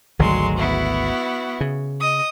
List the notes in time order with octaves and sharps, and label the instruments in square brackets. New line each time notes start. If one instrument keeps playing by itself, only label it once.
[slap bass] G#1 D2 D3 [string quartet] F#3 G#3 C6
[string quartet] B3 E4 F#4
[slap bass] C#3
[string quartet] D#5 D#6